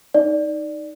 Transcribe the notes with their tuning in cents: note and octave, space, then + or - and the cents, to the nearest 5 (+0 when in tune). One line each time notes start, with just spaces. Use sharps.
D#4 +0 D5 +0